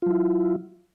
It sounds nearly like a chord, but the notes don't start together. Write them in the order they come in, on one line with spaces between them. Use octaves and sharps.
F4 F#3 E4